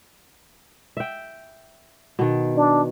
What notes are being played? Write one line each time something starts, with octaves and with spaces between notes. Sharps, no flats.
E5 G5
B2 D#3
D4